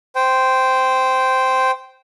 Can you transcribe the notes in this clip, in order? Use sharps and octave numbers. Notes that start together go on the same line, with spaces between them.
C5 G5